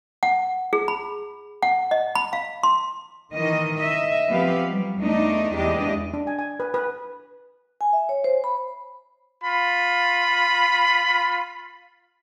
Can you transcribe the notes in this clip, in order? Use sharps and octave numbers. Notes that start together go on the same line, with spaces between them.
F#5
G#4
B5
F#5
D#5
B5
F5
C6
D#3 E3 D#5
D#5 E5
F3 B3 C4 G4 B4 F5
F#3 G3
E2 A3 D4 D#4 D#5
E2 G#3 D4 G4 D#5
D4
G#5
G#5
B4
B4
G#5
E5
C#5
C5
B5
F4 B5